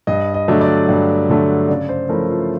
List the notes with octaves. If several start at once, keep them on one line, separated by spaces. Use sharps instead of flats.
G2 D#5
D#5
D3 F#3 A3 D4
D5
G2
D3 F#3 A3 D4
C#3 D5
C5
F3 A3 C#4 E4 A#4
F4